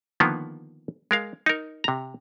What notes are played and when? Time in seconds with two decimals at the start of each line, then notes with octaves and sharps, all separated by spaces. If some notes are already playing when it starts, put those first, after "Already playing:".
0.20 D3 D#3 F3 A#3 B3
1.11 G#3 A#4 F5
1.46 D#4 A#4
1.84 C3 A#5